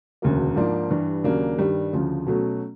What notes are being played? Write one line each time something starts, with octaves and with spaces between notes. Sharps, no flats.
E1 D2 C#3 F#3 A#3
G#2 F3 A#3 D4
G2 E3 G3
D#2 C#3 F#3 A#3 D4
G2 D#3 G3
D2 C#3 F3
B2 F#3 A3 C#4